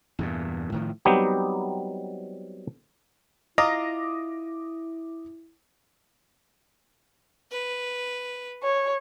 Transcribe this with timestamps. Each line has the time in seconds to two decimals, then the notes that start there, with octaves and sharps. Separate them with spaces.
0.19 E2 G2 A#2
0.72 A2 D#3 F3
1.05 F#3 G3 B3 C4 D#4 G4
3.58 E4 F4 D#5 A#5 D6 D#6 A#6
7.52 B4
8.63 C#5